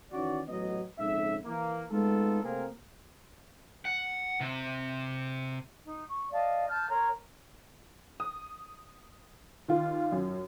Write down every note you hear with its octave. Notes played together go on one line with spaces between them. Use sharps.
D#3 E3 C#4 F#4 D5
A1 F#3 B3 D#5
A#1 F2 G#2 C#3 E5
E3 A#3
G#3 A3 B3 D#4 F4 A4
C3 A3 A#3 C4 G#4 A#4
F#5
C3
D#4
C#6
D5 D#5 F5 A5
A5 F6 G6
A#4 C#5 A#5 C6
D#6
D#2 F4
F#2